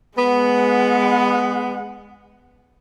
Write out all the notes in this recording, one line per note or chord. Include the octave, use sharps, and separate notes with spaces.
G#3 B3 F#5